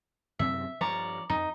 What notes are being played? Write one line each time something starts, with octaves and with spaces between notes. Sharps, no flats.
F#2 C3 C4 E5
G2 F3 C#5 D5 A#5
F2 D#4